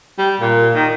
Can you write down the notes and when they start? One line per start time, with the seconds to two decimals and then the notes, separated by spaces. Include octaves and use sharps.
0.18 G3
0.40 A#2
0.75 D#3